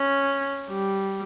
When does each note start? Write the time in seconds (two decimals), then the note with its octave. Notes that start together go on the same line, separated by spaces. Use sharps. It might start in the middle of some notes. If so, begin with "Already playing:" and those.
Already playing: C#4
0.69 G3